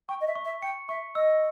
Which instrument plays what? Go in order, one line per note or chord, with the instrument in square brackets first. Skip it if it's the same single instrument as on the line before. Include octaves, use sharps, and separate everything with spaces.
[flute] G5 [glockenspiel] C#6
[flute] D#5
E5
[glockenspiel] C#6
[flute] E5
[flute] G5 [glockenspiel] C#7
[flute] E5 [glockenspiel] C#6
[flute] D#5 [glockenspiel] E6